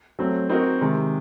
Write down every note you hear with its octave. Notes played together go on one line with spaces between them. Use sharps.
F#3 A3 C4
C4 D#4 F#4 A#4 D#5
C3 D#3 G#3